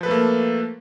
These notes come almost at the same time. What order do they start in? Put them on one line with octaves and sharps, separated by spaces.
F3 B4 A4 A3 A#3